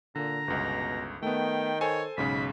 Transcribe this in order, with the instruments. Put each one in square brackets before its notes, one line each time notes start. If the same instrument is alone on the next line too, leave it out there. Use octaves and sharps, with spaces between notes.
[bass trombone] A#2 [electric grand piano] D3 [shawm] A#5
[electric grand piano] G1 C#2 [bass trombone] B2
[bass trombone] D#3 [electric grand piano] A3 B3 [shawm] G5
[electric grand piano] A4 C5 G#5 [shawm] C#5
[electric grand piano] B1 G#2 C#3 [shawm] B5